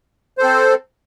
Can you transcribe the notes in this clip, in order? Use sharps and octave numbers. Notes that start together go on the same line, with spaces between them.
C4 A4 C5